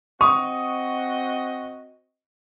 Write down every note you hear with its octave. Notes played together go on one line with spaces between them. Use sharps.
C4 F#4 D#5 C#6 D#6 F7